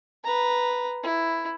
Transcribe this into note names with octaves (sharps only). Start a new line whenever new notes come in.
B4 A#5
E4